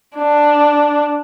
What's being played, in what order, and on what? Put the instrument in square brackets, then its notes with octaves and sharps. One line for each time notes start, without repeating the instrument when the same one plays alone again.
[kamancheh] D4